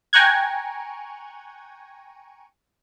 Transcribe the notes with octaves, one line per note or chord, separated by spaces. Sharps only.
G5 G#5 A#5 C#6 F#6 G#6